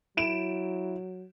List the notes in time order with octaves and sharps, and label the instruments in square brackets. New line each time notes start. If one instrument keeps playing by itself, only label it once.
[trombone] F#3 [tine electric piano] E4 [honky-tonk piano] D7 E7